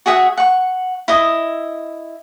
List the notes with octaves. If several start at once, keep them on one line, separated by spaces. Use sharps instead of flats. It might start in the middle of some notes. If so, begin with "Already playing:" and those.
F#4 G#4 E5 F#5
F#5 C#6
E4 D#5